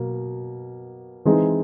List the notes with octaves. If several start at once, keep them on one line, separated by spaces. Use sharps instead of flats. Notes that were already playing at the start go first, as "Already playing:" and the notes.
Already playing: B2 F#3 A#3
E3 G#3 C4 D#4 G#4